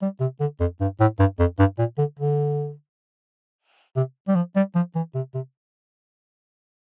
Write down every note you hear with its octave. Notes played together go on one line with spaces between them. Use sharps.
G3
C3
D3
F2
G2
A2
G2
F2
G2
A#2
D3
D3
C3
G3
F3
G3
F3
E3
C3
C3